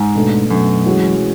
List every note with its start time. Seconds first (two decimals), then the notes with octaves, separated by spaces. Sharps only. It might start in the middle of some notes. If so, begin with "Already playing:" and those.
Already playing: G#2
0.15 B2 A3 D4 A4
0.50 F#2 B2 A3 D4 A4
0.85 E3 G#3 C#4 F#4